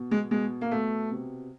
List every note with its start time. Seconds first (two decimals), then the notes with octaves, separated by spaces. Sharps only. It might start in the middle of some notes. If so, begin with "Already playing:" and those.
Already playing: B2
0.11 G#3
0.31 B2 G#3
0.61 A#3
0.71 B2 A3
1.11 C3